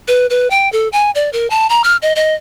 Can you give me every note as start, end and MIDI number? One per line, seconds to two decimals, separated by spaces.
0.08 0.26 71
0.30 0.50 71
0.50 0.70 79
0.72 0.88 69
0.92 1.11 80
1.15 1.30 74
1.33 1.49 70
1.50 1.67 81
1.70 1.82 82
1.84 1.96 89
2.02 2.13 75
2.16 2.34 75